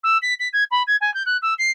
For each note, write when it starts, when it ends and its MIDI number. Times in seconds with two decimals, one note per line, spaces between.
0.03 0.18 88
0.22 0.34 95
0.39 0.48 95
0.53 0.64 92
0.71 0.83 83
0.87 0.96 92
1.01 1.13 80
1.14 1.23 91
1.26 1.37 90
1.42 1.54 88
1.58 1.71 96